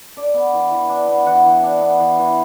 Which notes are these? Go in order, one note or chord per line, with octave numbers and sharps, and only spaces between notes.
D4 D5
B3
E3
E3
D4
B3
E3 F#5
E3
D4
B3
E3
E3